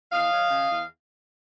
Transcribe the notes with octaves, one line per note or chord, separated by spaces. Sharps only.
E2 D#5 F5
F#3
C#3
E2